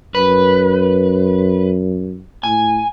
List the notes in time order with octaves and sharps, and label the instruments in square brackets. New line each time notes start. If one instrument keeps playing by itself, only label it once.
[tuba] F#2 [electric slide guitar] B4
[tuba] A2 [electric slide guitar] G#5